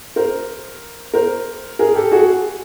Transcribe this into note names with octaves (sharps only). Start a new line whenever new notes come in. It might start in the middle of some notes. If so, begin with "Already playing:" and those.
A#4 C5
A#4 C5
G#4 A#4
G4 A4
F#4 G#4